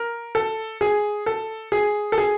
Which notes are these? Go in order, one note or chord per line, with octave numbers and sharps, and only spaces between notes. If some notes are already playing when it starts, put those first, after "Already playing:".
Already playing: A#4
A4
G#4
A4
G#4
A4
G#4